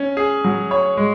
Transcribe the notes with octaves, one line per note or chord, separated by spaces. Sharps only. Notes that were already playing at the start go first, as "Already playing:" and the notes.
Already playing: C#4
G#4
F#3
C#5
G#3